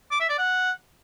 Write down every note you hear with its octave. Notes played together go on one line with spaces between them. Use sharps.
D6
E5
D5
F#5